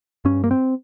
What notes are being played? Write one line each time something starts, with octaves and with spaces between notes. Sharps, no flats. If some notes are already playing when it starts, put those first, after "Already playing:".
G2 C#4
A#3
C4